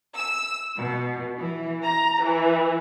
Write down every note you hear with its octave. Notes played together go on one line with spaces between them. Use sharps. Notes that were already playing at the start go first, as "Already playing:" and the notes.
E6
B2
E3
A#5
E3